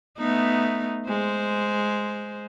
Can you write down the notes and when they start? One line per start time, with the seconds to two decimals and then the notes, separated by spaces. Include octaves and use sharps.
0.18 A3 B3 D#4
1.08 G#3 C5